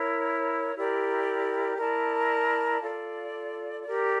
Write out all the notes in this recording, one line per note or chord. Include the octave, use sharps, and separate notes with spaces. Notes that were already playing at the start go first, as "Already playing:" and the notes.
Already playing: E4 A#4 C#5
E4 G4 A#4 D5
E4 A#4 D5 A5
F4 A4 D5
G4 A#4 D5